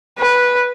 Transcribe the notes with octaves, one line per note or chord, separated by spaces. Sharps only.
B4